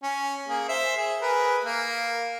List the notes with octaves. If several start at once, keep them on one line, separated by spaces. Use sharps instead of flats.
C#4
A#3 G#4
C5 E5
G#4
G#4 A#4 B4
A#3